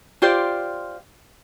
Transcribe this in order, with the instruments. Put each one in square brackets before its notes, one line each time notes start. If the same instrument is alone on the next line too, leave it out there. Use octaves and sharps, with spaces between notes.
[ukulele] F4 G4 C5 D5